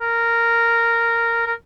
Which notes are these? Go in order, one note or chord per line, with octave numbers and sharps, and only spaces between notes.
A#4
A#4